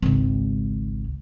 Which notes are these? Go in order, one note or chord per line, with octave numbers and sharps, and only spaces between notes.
G#1 C#2